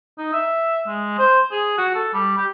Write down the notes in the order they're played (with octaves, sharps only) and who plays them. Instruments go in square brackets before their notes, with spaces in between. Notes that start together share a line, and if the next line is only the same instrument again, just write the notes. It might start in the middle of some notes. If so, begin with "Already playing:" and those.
[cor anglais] D#4
E5
G#3
C5
G#4
F#4
A4
G3
G4